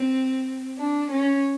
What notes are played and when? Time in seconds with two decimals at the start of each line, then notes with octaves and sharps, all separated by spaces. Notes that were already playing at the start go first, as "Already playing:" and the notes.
Already playing: C4
0.78 D4
1.11 C#4